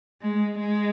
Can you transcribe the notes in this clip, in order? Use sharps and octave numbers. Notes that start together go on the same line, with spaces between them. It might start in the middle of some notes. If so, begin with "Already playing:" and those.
G#3
G#3